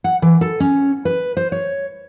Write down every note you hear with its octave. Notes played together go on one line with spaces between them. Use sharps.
F#5
E3
A4
C#4
B4
C5
C#5